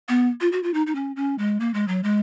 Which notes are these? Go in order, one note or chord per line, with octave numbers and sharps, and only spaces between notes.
B3
F4
F#4
F4
D#4
D#4
C#4
C#4
G#3
A#3
G#3
F#3
G#3